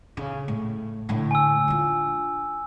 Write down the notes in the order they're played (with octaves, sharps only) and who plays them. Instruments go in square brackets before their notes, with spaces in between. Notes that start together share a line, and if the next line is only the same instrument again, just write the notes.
[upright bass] C#3
A2
A2 D3
[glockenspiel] G#5 E6
[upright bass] D4 F4